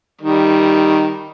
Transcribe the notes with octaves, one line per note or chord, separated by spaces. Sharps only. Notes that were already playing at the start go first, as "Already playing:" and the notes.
D#3 G3